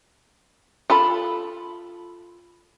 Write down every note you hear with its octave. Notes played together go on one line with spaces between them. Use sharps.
F4 A4 B5